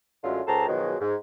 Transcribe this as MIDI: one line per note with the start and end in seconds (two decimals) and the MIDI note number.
0.24 0.40 42
0.24 0.40 50
0.24 0.40 54
0.24 0.40 56
0.24 0.40 57
0.24 0.40 65
0.47 0.66 37
0.47 0.66 69
0.47 0.66 72
0.47 0.66 79
0.47 0.66 81
0.47 0.66 82
0.68 0.95 47
0.68 0.95 51
0.68 0.95 53
0.68 0.95 54
0.68 0.95 56
1.01 1.15 44